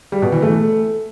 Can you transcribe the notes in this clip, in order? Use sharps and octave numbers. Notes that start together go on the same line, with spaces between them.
G3
B2
E3
A3